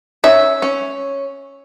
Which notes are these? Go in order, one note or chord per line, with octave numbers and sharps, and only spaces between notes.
C#4 E5
C#4